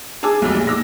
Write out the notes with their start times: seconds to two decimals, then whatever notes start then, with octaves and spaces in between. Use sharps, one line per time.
0.23 G#4 A5 D6 E6
0.42 F1 B1
0.54 A#2
0.67 D6 E6 A#6